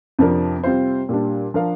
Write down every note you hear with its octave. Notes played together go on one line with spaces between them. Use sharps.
F2 C3 F3 D4 A#4
C3 G3 C4 F4 C5
A#2 G3 D4
F3 D4 A#4 F5